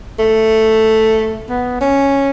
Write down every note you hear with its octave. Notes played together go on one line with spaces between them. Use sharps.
A3
B3
C#4